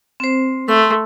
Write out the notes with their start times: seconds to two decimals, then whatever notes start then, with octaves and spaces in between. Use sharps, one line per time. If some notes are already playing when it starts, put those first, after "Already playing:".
0.20 C4 C5
0.68 A3 C6